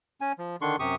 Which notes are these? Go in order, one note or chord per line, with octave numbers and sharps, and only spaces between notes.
C#4 G#5
F3
D3 D#3 D4 C6 C#6
F#2 C3 G4 C#6 D#6